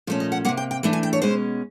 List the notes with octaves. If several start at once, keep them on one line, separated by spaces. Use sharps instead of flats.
A#2 F3 A3 C#4
D#5
F#5
C3 F3 A#3 F#5
G5
G5
E3 A3 D4
G#5
G5
C#5
B2 G#3 C#4 C5